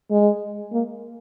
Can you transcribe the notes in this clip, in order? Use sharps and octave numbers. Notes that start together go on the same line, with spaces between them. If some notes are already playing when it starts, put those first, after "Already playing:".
G#3
A#3